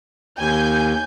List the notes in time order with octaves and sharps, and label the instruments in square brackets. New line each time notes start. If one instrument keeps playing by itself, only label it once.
[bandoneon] D#2 [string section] G#5 G6